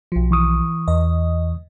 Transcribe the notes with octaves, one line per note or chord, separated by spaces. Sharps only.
B1 F3
E3 C#6 D#6
E2 D#5